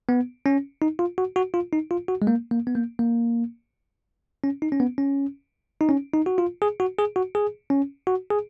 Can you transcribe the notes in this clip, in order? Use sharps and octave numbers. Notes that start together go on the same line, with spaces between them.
B3
C#4
D#4
F4
F#4
F#4
F4
D#4
F4
F#4
G#3
A#3
A#3
B3
A#3
A#3
C#4
D#4
C#4
B3
C#4
D#4
C#4
D#4
F#4
F4
G#4
F#4
G#4
F#4
G#4
C#4
F#4
G#4